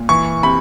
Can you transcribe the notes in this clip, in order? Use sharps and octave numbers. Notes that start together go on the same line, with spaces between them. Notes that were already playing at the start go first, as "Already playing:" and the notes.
Already playing: A#2
E3 C#6
C3 B5